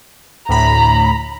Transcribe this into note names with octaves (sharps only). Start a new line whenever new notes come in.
D2 A2 A#5 B5